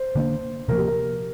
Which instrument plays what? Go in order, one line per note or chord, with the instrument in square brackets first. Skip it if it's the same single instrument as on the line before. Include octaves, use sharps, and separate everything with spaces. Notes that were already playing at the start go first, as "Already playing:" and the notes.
Already playing: [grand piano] C5
[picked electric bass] D3 A#3 D4
[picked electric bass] C3 F3 A#3 [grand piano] A#4
[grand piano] G4
A#4